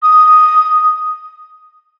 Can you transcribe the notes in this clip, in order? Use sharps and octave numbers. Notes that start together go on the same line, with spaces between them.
D#6